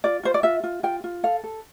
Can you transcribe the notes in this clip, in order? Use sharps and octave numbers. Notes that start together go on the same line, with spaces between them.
F4 D5
F4 C5
D5
F4 E5
F4
F4 G5
F4
A4 F5
A4